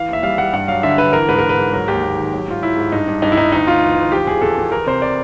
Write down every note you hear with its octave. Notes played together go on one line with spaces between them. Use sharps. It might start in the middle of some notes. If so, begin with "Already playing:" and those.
Already playing: E3 F5
D#2 E5
G3 F5
G3 F#5
G2 F#5
F#3 F5
D3 E5
D3 B4
E3 A#4
G#2 B4
G#2 A#4
B4
G#2
F#3 A#4
D#2 G4
D#2
D#3
F#3
G#2 F4
F#3 E4
G#2
G2 D#4
G2
G2 D#4
E4
G2 D#4
D2 D#4
D2 F4
E3
D2
F3 G4
E2 G#4
E2 A4
E2
E3 A#4
C3 C5
D5